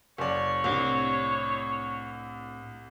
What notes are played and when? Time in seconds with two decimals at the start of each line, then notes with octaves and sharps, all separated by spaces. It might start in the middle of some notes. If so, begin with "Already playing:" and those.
0.18 F#1 C#5 D5
0.64 C2 A2 C4 D4